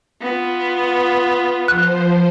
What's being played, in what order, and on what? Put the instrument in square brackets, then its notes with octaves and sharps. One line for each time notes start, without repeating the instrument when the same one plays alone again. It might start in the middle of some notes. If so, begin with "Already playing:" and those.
[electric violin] B3 F4
[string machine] F3 C5 [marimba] F#6